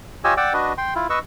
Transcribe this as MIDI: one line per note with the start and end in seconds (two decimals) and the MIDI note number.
0.24 0.34 65
0.24 0.34 67
0.24 0.34 73
0.24 0.34 75
0.24 0.34 80
0.24 0.34 88
0.37 0.53 74
0.37 0.53 78
0.37 0.53 79
0.37 0.53 86
0.37 0.53 88
0.54 0.73 62
0.54 0.73 66
0.54 0.73 71
0.54 0.73 75
0.78 0.94 79
0.78 0.94 84
0.95 1.07 64
0.95 1.07 65
1.10 1.19 71
1.10 1.19 75
1.10 1.19 85
1.10 1.19 88